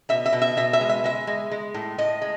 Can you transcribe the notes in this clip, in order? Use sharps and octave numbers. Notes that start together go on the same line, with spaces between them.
B2 E5
E5
B2
E5
B2 E5
E5
G#3
E5
G#3 E5
G#3
G#3
A2
A2 D#5
G#3